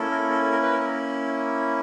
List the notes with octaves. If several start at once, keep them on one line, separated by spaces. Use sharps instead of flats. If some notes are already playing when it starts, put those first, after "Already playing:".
Already playing: A#3 C#4 E4 A4
A#4
A4
A#4
B4
A#4